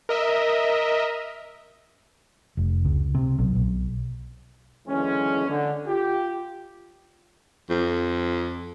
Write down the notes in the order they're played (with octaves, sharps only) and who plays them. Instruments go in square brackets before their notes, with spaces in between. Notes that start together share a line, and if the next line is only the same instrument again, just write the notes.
[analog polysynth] A#4 D#5 E5
[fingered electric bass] F1
C#2
C3
B1
B1
[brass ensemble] F#1 D3 E3 G#3 C#4
D3
F4 G4
[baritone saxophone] F2